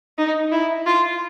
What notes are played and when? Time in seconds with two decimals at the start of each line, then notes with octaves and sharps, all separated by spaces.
0.18 D#4
0.52 E4
0.86 F4